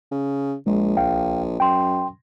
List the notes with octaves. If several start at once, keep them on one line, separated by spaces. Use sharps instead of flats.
C#3
A#1 G#3
C2 F5 G5
F#2 G5 C6